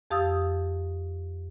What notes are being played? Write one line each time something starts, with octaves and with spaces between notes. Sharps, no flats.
F2 G4 F5 D#6 E6 A6